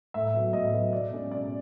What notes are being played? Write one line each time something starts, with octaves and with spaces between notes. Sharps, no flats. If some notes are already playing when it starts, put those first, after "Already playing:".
A2 E5
F#3 B3
A2 D#5
F#3 B3
B2 D5
G#3 C#4
B2 D5